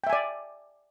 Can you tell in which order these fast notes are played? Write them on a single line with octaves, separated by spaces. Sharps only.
G5 E5 G#5 D5